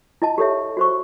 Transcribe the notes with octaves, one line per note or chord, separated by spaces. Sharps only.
E4 D#5 A5
G4 A4 C#5 E5
F#4 C5 C#6